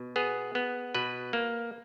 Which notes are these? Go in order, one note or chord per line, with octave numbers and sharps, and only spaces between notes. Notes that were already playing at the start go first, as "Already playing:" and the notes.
Already playing: B2
B3 G#4
B3
B2 B4
A#3